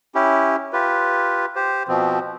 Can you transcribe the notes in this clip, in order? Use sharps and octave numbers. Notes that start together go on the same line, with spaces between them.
C#4 E4 G4
F4 G4 B4
G4 C5
B2 F3 C4